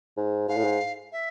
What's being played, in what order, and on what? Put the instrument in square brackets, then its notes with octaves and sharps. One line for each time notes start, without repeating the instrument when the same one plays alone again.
[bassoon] G#2
[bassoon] G#2 [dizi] F5
[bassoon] A2
G#2
[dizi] E5